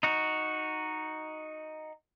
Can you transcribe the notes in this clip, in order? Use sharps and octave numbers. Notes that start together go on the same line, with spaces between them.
D#4 F#4